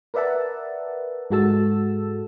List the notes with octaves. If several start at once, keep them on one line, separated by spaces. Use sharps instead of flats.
A#4 B4 D5 E5 F#5 A5
G#2 G#3 F#4 A4 A5 E6